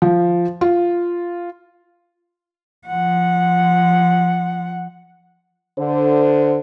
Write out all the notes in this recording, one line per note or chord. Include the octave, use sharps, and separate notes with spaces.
F3
F4
F3 F#5
D3 C5